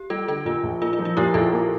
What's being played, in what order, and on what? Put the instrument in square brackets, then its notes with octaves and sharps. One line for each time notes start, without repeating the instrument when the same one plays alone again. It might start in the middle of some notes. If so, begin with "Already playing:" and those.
Already playing: [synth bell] G4
[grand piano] G3 [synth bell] F4 A4
[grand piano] D3 [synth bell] F4 A4
[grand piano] A#2 [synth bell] F4
[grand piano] A#1
[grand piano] A#3 [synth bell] F4
[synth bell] F4
[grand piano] F3
[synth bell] F4
[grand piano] A#2 [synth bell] E4 G4
[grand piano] A#1 [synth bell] F4 A4
[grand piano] A#3